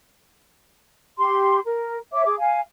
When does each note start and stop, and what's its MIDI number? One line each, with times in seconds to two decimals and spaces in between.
1.18 1.59 67
1.18 1.59 84
1.65 1.98 70
2.13 2.24 73
2.13 2.24 76
2.13 2.24 86
2.25 2.35 68
2.25 2.35 86
2.40 2.60 77
2.40 2.60 80